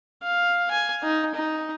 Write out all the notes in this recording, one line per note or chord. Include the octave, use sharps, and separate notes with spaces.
F5
G#5
D#4
D#4